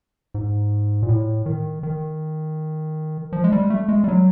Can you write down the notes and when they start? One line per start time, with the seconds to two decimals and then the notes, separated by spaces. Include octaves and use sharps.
0.34 G#2
1.03 A#2
1.09 A2
1.46 D#3
1.83 D#3
3.33 F3
3.44 G#3
3.52 G3
3.70 A3
3.89 G#3
4.04 G3
4.08 F#3